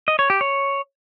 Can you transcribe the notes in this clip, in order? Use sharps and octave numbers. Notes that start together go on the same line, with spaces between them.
D#5
C#5
G4
C#5